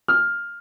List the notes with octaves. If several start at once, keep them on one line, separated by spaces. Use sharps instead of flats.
F6